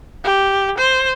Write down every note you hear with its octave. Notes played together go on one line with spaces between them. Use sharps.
G4
C5